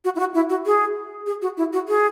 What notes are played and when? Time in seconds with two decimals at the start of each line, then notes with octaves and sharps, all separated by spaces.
0.04 F#4
0.15 E4
0.19 F#4
0.34 E4
0.50 F#4
0.66 G#4
1.26 G#4
1.42 F#4
1.57 E4
1.73 F#4
1.88 G#4